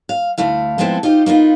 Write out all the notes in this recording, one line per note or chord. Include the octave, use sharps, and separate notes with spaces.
F5
D2 A3 E4 F5
F3 G#3 A3 B3 C4 A4
D#4 F4 G4 C5 D#5
A#3 B3 D#4 F4